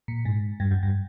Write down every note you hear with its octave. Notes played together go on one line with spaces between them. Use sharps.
A#2
G#2
G2
F#2
G2